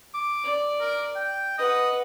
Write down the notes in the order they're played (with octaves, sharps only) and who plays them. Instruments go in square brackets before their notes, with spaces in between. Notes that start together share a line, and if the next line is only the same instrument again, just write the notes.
[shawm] D6
[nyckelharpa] D5
[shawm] A#4
G5
[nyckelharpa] B4 F#5 [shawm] D#5